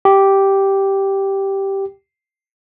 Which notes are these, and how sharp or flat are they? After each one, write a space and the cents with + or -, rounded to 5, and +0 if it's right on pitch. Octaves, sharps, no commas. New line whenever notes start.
G4 -5